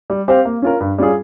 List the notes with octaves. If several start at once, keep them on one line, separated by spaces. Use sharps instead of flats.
G3
C4 G4 C5 F5
A#3
C#4 F4 A#4
G2
G3 C#4 F4 G#4